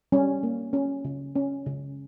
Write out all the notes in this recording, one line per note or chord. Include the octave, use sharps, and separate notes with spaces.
G3 C#4
A#3
C#4
C#3
C#4
C#3